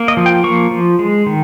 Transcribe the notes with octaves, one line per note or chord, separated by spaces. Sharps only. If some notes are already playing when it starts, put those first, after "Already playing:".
Already playing: A#3
D#5
F3
G5
A#3 C#6
F3
G#3
D#3